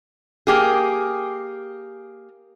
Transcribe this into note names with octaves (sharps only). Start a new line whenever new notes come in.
A#3 G4 G#4